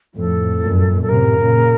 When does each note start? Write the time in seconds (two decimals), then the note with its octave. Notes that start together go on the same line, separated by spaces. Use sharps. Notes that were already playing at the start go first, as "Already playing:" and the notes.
0.16 F2 A2 A4
0.63 F#2 A#2
1.02 A4
1.08 A2 C3 A#4
1.39 A#2 C#3